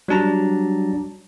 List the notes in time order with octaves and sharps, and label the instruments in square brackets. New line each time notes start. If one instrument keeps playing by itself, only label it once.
[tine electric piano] F#3 G3 D4 A5 A#5